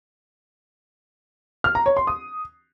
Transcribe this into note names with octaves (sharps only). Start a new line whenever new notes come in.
F6
A#5
C#5
C6
D#6